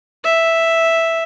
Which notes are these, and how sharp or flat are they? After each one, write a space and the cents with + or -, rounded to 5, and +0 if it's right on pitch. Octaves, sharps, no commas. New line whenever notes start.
E5 +0